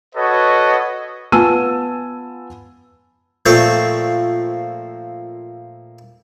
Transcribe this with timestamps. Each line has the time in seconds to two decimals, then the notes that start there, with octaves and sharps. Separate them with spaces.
0.15 F#4 A4 B4 C#5 D#5
1.32 B3 F4 G#5 A5 E6 D#7
3.46 A#2 F3 A3 C4 C5 C#5